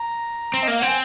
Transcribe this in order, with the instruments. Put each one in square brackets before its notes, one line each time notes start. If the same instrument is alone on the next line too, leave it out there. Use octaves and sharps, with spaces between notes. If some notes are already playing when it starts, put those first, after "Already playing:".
Already playing: [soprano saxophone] A#5
[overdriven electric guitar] C4
[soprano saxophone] D#5
[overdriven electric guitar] A#3 [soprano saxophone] F5
[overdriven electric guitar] C4 [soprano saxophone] F#5
[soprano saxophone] G#5